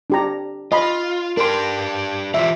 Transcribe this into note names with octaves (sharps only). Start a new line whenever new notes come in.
D4 G4 A#5
F4 D#5 B5
D4 G4 A#4 C6
E3 F4 G4 E5